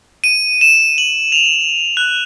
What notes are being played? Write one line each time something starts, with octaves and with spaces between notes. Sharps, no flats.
D#7
E7
F#7
F7
F#6